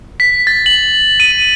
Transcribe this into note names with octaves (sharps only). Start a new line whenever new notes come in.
B6
A6
F#7
D#7